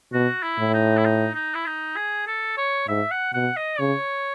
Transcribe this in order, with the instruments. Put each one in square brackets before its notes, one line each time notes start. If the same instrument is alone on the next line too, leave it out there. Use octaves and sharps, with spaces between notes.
[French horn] B2 [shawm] F#4
[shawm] E4
[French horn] A2
[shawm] D#4
E4
D#4
D#4
E4
D#4
G#4
A4
C#5
[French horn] G#2 [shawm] E5
[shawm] F#5
[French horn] B2 [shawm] F#5
[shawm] D#5
[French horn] C#3 [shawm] C#5